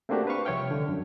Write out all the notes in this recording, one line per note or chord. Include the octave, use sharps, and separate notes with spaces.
A3 A#3 C4 D4 F#4 G4
B4 C5 F5 C#6
C2 F3 C#5 E5 G5 F6
D3
F#2